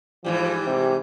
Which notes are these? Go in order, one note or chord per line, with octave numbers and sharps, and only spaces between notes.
G#2 E3 F3 G3
C3